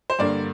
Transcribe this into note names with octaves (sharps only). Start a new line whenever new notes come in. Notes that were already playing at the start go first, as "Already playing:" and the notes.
C5
G2 D3 A#3 D5